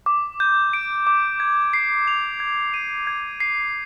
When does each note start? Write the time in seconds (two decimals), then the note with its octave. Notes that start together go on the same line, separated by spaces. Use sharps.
0.06 D6
0.40 G6
0.73 D7
1.07 D6
1.40 G#6
1.73 C7
2.08 F7
2.40 G#6
2.74 D#7
3.07 G#6
3.40 C7